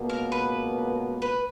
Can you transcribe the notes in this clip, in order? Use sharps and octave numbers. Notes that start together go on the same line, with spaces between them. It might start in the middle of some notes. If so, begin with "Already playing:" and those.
Already playing: C#2 B2 A#3
A#4
B4
B4